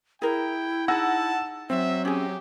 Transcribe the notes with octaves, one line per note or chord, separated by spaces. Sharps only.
E4 G#4 A#4 G5
D#4 G#4 F#5 A5 E6 A#6
F#3 C4 E5
C#4 G4 G#4